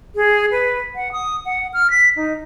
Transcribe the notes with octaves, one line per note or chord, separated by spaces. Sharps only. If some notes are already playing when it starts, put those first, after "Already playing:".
G#4
B4
F#5
D#6
F#5
F6
B6
D#4